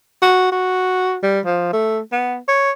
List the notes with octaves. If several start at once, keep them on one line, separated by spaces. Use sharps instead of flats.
F#4
F#4
G3
F3
A3
B3
C#5